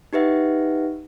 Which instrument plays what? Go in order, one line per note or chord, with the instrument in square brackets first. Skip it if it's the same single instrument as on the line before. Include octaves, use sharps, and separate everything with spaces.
[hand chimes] D#4 G4 B4 E5 F#5